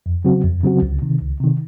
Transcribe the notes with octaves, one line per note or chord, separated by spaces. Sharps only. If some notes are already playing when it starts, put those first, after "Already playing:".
F2
C#3 F#3 C4 F#4
F2
C#3 F#3 C4 F#4
C#2
C3 D#3
C#2
C3 D#3